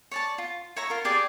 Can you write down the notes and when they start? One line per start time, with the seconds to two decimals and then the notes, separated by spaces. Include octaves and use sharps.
0.11 C#5 D5 A5
0.38 F4
0.76 C#5 E5 A#5 C#6
0.90 F4 A#4
1.05 G4 G#4 D5